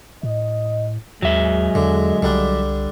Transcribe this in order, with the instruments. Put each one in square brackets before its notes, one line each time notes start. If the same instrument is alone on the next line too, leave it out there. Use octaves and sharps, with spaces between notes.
[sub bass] A2 [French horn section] D#5
[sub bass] D#2 [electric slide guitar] F#3 E5 [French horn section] G#3
[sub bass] E2 [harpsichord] D3
[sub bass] C2 [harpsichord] D3 G3 D4